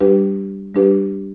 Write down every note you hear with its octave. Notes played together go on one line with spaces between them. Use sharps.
G3 D4 G4 B4
G3 D4 G4 B4